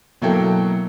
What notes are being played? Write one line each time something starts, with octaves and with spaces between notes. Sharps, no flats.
B2 F#3 A#3 E4 A4 G5